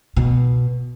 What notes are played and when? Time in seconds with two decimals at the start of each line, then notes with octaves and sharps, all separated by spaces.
0.16 B2